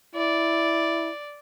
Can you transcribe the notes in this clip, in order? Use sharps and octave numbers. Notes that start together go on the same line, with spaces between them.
E4 D5